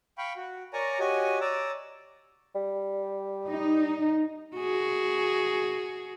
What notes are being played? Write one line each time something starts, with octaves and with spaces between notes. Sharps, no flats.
F5 G5 B5 C#6
F#4
A#4 C#5 D5 G#5 A#5 C#6
F#4 G4 C#5 D#5 G#5
C#5 D5 A#5 D6 E6
G3
D#4
F#4 G#4